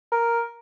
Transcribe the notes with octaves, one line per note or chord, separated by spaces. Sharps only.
A#4